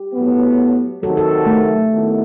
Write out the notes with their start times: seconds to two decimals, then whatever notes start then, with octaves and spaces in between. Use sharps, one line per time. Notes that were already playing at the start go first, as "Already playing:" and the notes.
Already playing: G4
0.14 A2 F#3 B3
1.02 C3 D#3 F#3 A4
1.17 A4
1.47 A3
1.91 D#2 D#3 F#3 B3 E4